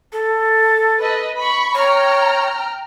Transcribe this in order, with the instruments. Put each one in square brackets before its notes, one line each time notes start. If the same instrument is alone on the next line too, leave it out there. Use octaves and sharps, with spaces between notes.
[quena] A4
[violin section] B4 D#5
B5 C#6
[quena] C#5 [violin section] G5 A#5 F6